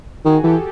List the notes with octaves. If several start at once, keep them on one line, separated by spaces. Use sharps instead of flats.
D#3 F#4 G#4
E3 G4 A4